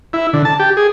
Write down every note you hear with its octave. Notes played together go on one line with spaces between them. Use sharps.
E4
D3
A5
G4
G#4